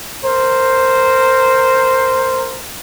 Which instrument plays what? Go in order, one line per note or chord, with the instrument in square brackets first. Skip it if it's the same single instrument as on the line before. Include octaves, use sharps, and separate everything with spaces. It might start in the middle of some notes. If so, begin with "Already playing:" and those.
[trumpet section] A#4 C5